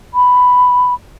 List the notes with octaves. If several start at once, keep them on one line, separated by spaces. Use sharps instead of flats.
B5